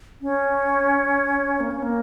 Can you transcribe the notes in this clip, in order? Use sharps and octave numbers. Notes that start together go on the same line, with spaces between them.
C#4
A#3
C#4
A#3